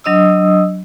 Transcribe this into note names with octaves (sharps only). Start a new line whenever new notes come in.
F#3 D4 D#5 D#6 E6